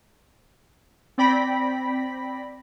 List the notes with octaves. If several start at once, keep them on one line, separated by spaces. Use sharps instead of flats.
C4 D5 G5 B5 A#6 B6